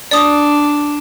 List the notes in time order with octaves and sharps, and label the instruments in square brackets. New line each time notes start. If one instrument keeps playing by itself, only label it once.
[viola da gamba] D4 [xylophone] D5 D#6